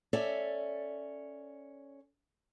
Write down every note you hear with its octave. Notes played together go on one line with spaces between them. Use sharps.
C#4 A4 D5 E5